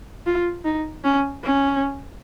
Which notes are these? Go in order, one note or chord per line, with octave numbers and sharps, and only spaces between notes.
F4
D#4
C#4
C#4